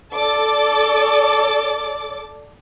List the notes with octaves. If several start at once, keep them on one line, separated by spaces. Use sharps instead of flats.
A4 D5 D6